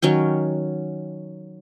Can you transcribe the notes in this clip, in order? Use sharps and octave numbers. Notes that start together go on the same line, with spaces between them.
D#3 F#3 C#4 G5